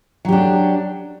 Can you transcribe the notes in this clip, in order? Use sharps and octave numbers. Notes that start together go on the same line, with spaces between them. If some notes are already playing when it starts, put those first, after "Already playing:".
F#3 D4 G4